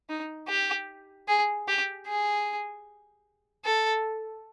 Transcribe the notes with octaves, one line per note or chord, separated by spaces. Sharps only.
D#4
G4
G#4
G4
G#4
A4